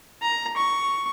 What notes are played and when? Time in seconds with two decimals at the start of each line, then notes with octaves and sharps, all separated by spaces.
0.22 A#5
0.57 C#6